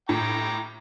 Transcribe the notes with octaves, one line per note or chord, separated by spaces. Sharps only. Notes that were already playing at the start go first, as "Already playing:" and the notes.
A2 G5 A#5 D6